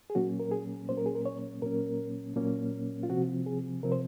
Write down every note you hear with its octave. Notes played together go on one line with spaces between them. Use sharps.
G#4
A#2 F#3 A#3 C#4 F#4
A#4
G#4
A#2 F#3 A#3 C#4 C5
A#4
G#4
A#4
C#5
A#2 F#3 A#3 C#4 A#4
A#2 F#3 A#3 C#4
F4
C3 F3 C4 F#4
G#4
C3 F3 C4 A#4
C5